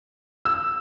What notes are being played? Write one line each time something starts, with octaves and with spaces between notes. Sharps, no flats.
E6